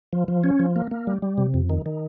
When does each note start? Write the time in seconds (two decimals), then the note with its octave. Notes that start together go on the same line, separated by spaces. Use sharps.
0.13 F3
0.28 F3
0.44 C#4
0.59 F3
0.76 A#3
0.91 A#3
1.07 G3
1.22 G3
1.38 C3
1.54 F2
1.70 D#3
1.86 D#3